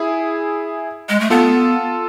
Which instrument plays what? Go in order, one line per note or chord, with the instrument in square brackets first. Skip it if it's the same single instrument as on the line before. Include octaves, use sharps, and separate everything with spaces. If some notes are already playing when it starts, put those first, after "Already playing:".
Already playing: [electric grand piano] E4 G#4
[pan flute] G#3
A3
[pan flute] B3 [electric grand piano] F4 A4